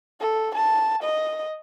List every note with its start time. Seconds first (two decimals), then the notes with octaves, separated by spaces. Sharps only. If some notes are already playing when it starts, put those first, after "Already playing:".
0.20 A4
0.55 A5
1.03 D#5